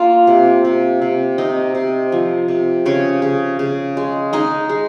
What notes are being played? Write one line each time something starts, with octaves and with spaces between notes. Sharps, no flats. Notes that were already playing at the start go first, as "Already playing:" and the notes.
Already playing: A#3 F4 F5
C3
C3
C3
C3 D#4 D#5
C3
F3
C3
C#3 C#4 C#5
C#3
C#3
G#3
G#3 D#4 D#5
G#3